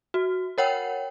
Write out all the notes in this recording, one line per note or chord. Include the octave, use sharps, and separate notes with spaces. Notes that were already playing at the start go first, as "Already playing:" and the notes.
F#4
A#4 C#5 F#5 G5